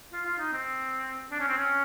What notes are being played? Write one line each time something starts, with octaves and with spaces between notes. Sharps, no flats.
F4
F4
D#4
C4
D4
C#4
C4
C#4